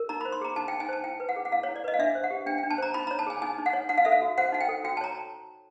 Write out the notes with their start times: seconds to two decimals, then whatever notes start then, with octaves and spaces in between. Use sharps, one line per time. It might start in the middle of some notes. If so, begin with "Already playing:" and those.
Already playing: A#4
0.09 D#4 A#5
0.21 C5 B5
0.32 C6
0.41 G#4 A#5
0.56 D#4 A5
0.68 D#4 G5
0.80 G#5
0.89 C5 A5
1.04 E4 G5
1.20 B4
1.29 F#5
1.36 G#4
1.45 F#5
1.51 E4 F5
1.63 E4 C#5
1.76 D5
1.84 B4 D#5
1.94 F5
1.99 D4 E5
2.15 C5
2.24 F#5
2.31 G4
2.46 D4 G5
2.58 G5
2.63 D4
2.71 A5
2.78 C5 A#5
2.94 D#4 B5
3.07 C#5 A#5
3.19 A5
3.26 G#4 G#5
3.42 D#4 G#5
3.58 D#4
3.66 F#5
3.73 C#5
3.89 D#4 F#5
3.98 F5
4.05 A4 E5
4.12 F5
4.22 F#4
4.38 C5 F#5
4.52 D#4 F#5
4.61 G5
4.69 A4
4.84 F#4 G5
4.97 A5
5.01 C#5 A#5